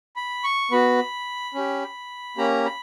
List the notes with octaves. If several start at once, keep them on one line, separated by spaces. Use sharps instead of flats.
B5
C#6
B3 F#4 B5
C#4 G4
A#3 C#4 G4 A#5
B5